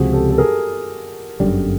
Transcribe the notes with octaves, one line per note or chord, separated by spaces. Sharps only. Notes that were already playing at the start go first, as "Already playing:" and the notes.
Already playing: C#2 C3 F3 F#4 G#4
G4 A4
A4
G#4 A#4
G1 F#2 D3 G3